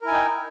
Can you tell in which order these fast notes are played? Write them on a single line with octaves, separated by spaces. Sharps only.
A#4 E4 G#5 D#4 G5